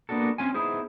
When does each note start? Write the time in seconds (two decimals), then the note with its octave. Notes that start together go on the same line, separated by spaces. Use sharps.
0.09 A#3 B3 D4 F#4 A4
0.38 C4 C#4 F4 G#5
0.54 B3 D#4 E4 G#4 C5